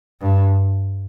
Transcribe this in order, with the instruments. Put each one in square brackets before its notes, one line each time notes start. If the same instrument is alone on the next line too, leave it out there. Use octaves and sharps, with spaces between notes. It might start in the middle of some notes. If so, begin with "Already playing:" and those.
[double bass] G2